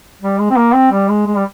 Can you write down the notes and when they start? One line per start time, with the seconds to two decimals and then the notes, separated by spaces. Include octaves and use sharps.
0.22 G3
0.39 G#3
0.50 C4
0.56 A#3
0.74 C4
0.92 G3
1.09 G#3
1.27 G#3
1.36 G3